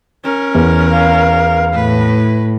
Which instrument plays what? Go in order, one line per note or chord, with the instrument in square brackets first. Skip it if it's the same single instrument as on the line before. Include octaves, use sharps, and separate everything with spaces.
[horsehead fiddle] C#4 A#4
[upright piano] E2
[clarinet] F5
[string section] A2 [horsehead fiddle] B4